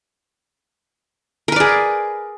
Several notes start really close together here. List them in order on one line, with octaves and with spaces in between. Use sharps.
A#4 B4 D5 G#4